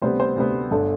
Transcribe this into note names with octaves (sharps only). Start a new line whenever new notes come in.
D2 C3 G3 B3 C5
C5
D2 C3 G3 B3
G1 D3 A4